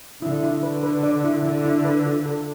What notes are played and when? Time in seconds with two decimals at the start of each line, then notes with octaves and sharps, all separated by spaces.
0.22 D3 E4
0.43 E4
0.63 D3 B4
0.83 B4
1.03 D5
1.24 E4
1.45 D3 E4
1.65 E4
1.85 B4
2.05 F4
2.26 A4